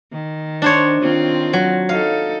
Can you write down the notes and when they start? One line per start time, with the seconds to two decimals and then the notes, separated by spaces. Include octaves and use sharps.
0.12 D#3
0.62 D4 C5 C#5
1.01 D#3 C4 F4
1.53 F#3
1.89 D#4 A4 F5